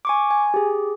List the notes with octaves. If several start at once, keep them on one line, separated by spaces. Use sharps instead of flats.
G#5 C#6 D6
G#5
G4 G#4